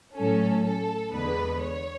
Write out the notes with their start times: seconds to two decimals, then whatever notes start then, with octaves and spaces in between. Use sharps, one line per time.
0.15 A2 F#3 C#4 A4
0.64 A4
1.12 E2 D3 G#3 B3 B4
1.61 C#5